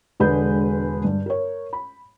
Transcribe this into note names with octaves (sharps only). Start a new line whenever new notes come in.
E1 D3 G#3 G#4 B4 G6
G2
A#4 C#5
B5